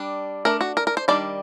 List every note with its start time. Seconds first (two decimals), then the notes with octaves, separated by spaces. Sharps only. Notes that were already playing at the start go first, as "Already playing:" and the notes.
Already playing: G3 D4
0.45 A3 D4 A#4
0.61 F#4
0.77 A#4
0.87 A#4
0.97 C5
1.08 D#3 G3 D4 D5